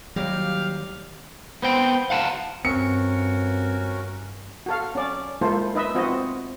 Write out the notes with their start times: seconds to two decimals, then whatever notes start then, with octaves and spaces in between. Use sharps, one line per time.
0.16 D#2 F#3 G3 G4 F5
1.62 B3 C5 G5
2.10 F5 F#5 A5
2.65 G2 C4 C#4 F#4 A#4 C#7
4.66 F#4 A4 F5
4.95 C#4 D5
5.41 G#3 A#3 E4 F4 A4 C5
5.74 D#4 B4 D#5 E5
5.95 C4 F4 F#4 D#5